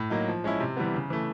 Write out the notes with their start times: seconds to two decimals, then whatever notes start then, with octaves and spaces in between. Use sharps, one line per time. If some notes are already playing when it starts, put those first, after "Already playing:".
Already playing: A2
0.10 F#3 A#3 D#4
0.28 F3
0.44 G#3 C#4 E4
0.60 C3
0.77 E3 G3 B3
0.94 C#3
1.10 E3 A3